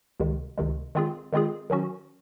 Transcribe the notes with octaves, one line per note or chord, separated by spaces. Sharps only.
C#2 C3 D#3 G#3
C#2 C3 D#3 G#3
D#3 G#3 C4 F4 G#4
D#3 G#3 C4 F4 G#4
D#3 F#3 C#4 F#4